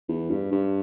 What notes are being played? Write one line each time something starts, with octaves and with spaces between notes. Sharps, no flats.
E2
G2
G2